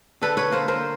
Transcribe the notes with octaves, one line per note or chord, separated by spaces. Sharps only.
D3 A4 B4
B4 C#5
A#3 A#4 C5
A#4 C5